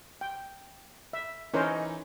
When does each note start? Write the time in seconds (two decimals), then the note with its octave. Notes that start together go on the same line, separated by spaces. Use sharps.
0.21 G5
1.13 E5
1.54 E3 C#4 D#4 A#4 C5 D#5